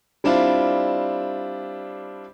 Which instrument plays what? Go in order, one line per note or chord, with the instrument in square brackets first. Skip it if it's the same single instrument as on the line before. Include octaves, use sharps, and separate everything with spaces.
[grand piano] G3 C4 D4 E4 F4